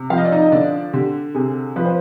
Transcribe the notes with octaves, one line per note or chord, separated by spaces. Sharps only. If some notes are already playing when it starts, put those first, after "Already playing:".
Already playing: C3
F3 F5
D#5
D5
D#4 D#5
D#5
D3 D4 D5
D3 G4
C3 G#4
F3 B4
C5